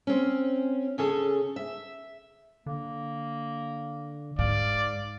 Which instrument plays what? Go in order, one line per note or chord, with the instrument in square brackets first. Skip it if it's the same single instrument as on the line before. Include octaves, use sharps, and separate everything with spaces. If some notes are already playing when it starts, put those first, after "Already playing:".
[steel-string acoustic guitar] C4 C#4
C#3 C#4 G#4 A4
E5
[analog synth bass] D3 [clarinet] A#3
[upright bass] G#2 [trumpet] D5 [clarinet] F5